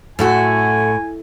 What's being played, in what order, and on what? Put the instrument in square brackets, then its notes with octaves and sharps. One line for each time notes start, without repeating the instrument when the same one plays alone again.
[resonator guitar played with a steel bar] F#2 A3 F#4 [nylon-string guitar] A2 [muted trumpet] G#5